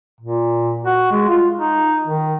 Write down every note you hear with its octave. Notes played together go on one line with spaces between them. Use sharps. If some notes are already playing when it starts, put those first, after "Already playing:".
A#2
F#4
G#3
F4
D#4
D#3